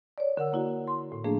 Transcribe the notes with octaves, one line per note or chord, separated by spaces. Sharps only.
C#5 D5
D3 A#4 F#5 E6
A#3 E4 F#4
C6
A2
F3 A3 A#3 D4 G#4